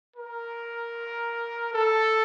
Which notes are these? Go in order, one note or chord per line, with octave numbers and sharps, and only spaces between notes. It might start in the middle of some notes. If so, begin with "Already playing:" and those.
A#4
A4